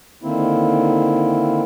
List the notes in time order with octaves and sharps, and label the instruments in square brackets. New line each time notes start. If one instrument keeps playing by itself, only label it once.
[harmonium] D3 D#3 A#3 C4 E4